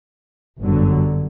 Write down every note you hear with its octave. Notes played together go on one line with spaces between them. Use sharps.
G1 F#2 D3 F#3